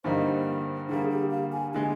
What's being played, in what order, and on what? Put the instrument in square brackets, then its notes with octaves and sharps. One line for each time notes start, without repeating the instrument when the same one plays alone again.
[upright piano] G2 D3 G3 A#3 D#4 [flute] C5
[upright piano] D3 G3 A#3 [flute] G#4
[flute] G4
F5
G#5
[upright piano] D3 G#3 [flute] G#5